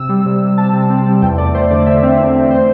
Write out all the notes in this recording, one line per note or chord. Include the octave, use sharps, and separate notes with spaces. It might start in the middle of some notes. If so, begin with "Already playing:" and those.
Already playing: C3 E6
G3
C3
C3
C3 A5
C3
C4
G3
E2 G5
A3 D5
A3 C5
D3 D5
D3 E5
C4
E2
C4
C5